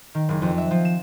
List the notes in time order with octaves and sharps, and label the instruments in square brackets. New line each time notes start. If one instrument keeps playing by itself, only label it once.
[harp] D#3
F#1
F2
E5
F3
E7